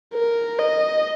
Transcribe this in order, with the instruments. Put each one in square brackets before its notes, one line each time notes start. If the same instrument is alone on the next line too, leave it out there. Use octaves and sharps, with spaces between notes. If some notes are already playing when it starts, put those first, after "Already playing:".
[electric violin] A#4
D#5